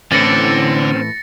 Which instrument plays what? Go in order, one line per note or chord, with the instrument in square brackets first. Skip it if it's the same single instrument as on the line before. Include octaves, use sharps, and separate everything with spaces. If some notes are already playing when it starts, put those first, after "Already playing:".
[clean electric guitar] A2 E3 [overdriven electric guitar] D3 [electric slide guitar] C4 C#4 [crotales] A6 A#6 C#7